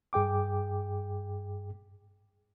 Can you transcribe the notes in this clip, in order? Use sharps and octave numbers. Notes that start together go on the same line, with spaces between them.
G2 G#4 G5 D6